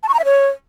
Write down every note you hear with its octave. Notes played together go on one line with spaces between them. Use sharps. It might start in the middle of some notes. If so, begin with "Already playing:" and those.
A5
C#6
A#5
E5
C#5